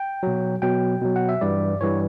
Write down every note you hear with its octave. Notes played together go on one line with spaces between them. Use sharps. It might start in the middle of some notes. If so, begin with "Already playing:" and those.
Already playing: G5
B2 F#3
B2 F#3 G5
B2 F#3
F#5
E5
G2 E3 G3 D5
G2 E3 G3 C#5